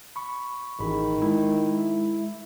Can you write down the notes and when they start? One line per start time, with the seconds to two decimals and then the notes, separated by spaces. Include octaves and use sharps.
0.16 B5 C#6
0.80 A1 D#3 G#4 B5
1.22 G#3 E4